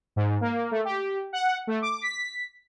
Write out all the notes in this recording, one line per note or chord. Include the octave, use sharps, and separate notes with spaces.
G#2
A#3
A3
G4
F#5
A3
D6
B6